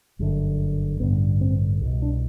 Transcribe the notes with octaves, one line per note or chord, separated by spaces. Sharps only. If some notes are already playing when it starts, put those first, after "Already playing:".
G1 F#2 D3
A1 G2 D3 B3
C4
C2 B2
D4